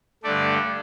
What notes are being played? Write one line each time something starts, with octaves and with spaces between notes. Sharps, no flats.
G2 D3 A3 D5